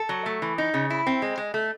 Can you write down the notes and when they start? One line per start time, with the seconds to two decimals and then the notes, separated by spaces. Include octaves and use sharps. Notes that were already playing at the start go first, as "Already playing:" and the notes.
Already playing: A4
0.09 F#3
0.26 A3
0.42 E3
0.58 D#4
0.74 C#3
0.90 E4
1.07 C4
1.22 G#3
1.38 G#3
1.54 A3